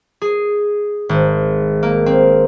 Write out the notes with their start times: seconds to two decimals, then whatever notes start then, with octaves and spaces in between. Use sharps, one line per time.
0.22 G#4
1.09 G#1
1.83 A#3
2.06 C4